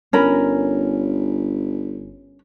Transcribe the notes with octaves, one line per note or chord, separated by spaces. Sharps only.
G1 C#4 A#4 B5